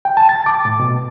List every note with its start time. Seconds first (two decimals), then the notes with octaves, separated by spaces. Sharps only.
0.05 G5
0.17 A5
0.29 A6
0.46 D6
0.65 A2
0.80 B2